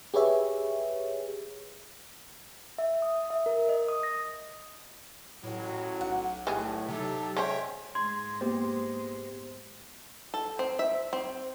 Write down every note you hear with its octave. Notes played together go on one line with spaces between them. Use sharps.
G4 G#4 B4 C#5 E5
E5
D#6
E5
A#4
D#5
D#6
A#6
A1 A2 F#3
B1 F#5
A2 G3 B3 G#4
C3 F#3 D#4 G4 A4
G#3 C#4 C5 C#5 E5 G5
G#2 G#3 C6 G#6
A#3 B3 G4 C5
A4
C4
E5
C4